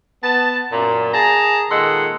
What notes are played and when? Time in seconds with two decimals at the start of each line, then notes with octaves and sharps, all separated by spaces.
0.23 B3 A5
0.72 F#2 A#2
1.14 G#4 A5 A#5
1.71 A#2 D#3 G#3 A4 F#5 C6